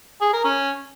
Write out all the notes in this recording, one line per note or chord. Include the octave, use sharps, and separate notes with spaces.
G#4
A#4
C#4